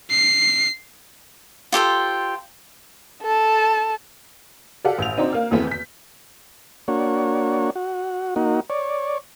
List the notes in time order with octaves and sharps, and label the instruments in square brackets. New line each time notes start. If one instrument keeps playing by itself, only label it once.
[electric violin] C7
[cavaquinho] F4 G4 A4 C5
[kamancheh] A4 A5
[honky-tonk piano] G4 A4 D5 F5 F#5
A1 G6 F7
C4 D4 D#4 F#4 C5
A#3 F6
E2 E3 A3 B3 C4
G6 B6
[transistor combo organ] A#3 D4 F#4 C#5
F#4
A#3 D#4 F#4
C#5 D5